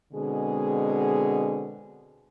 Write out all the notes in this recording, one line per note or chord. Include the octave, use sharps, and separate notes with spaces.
B2 D3 G#3 C4 G#4